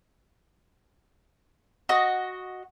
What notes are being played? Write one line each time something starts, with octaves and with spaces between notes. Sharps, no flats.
F#4 D#5